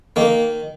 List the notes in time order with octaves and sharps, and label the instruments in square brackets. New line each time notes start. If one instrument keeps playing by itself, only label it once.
[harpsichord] D#3 A#3